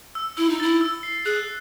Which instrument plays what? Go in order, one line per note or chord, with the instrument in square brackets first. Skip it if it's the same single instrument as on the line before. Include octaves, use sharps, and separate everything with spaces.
[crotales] E6
[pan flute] E4 [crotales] E6
[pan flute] D#4
[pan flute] E4 [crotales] A6
[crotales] E6
C7
[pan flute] G#4 [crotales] F#6